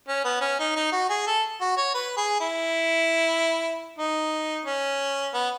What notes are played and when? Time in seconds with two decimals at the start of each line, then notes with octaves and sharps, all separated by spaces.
0.08 C#4
0.24 B3
0.41 C#4
0.59 D#4
0.76 D#4
0.92 F#4
1.09 G#4
1.27 A4
1.61 F#4
1.77 C#5
1.94 B4
2.17 G#4
2.40 E4
3.99 D#4
4.66 C#4
5.34 B3